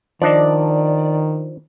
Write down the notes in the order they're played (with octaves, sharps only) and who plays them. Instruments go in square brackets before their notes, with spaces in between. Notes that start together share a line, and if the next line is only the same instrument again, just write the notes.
[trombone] D#3 [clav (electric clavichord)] F3 D4 D#5 [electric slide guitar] D5